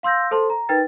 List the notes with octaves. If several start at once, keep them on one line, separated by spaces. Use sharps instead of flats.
F5 C6 E6 G6 A#6
A4 C5 A5 C6
A#5
D#4 A#4 B4 G5 A6